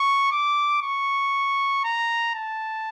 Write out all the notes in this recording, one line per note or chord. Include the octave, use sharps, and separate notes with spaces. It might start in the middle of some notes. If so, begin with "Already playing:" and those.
Already playing: C#6
D6
C#6
A#5
A5